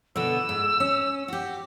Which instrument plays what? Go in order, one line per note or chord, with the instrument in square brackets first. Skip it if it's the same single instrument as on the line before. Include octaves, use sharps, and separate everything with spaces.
[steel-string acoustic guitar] B2 D3 B3 [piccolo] E6
[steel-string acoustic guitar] G#2
C#4
F#4 G4